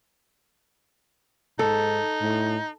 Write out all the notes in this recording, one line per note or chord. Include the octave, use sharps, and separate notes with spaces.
G#2 D#4 A4
A2